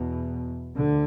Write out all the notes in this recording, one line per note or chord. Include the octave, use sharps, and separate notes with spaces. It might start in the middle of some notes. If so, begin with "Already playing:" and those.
Already playing: E2 B2
D2 D3